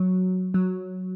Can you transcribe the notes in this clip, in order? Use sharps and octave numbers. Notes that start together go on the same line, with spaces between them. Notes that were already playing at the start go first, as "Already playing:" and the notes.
Already playing: F#3
F#3